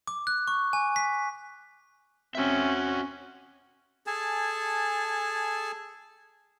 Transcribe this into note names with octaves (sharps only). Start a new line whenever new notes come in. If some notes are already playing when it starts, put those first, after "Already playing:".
D6
F#6
C#6
G#5
B6
C4 C#4 F#4 E5
G#4 A4 G#5 A5